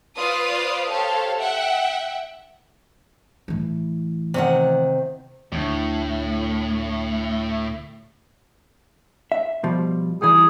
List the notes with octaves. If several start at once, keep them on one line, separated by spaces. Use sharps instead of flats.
F4 B4 C5 D5 F5 D#6
G4 A4 C5 C#5 F5
E5 F#5 G5
A2 E3
C3 D#3 F#5
D2 A2
E5
B2 F3 G3
E3 G3 G#4